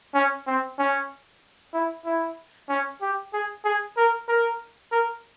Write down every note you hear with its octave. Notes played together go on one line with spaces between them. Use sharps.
C#4
C4
C#4
E4
E4
C#4
G4
G#4
G#4
A#4
A#4
A#4